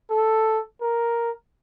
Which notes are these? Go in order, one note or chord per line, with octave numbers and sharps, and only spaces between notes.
A4
A#4